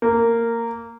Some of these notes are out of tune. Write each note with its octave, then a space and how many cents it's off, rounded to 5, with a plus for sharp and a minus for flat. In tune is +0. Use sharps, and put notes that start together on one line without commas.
A#3 -15